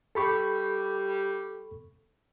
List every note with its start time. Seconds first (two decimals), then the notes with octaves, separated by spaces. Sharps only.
0.15 G3 G4 A4 B5 C#6